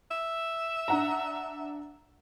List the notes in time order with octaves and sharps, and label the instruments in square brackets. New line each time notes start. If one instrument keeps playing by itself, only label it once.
[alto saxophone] E5
[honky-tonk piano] D4 F#5 A#5